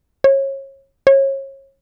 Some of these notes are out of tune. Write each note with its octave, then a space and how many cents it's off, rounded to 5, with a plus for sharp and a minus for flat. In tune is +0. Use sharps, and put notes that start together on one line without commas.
C#5 -30
C#5 -30